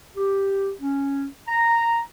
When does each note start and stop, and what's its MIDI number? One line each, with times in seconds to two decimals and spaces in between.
0.16 0.70 67
0.80 1.26 61
1.47 1.99 82